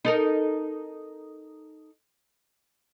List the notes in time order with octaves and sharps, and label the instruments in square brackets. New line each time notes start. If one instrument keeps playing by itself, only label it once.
[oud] D#4 A4 A#4